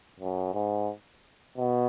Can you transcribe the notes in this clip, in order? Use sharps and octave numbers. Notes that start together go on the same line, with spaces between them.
F#2
G#2
B2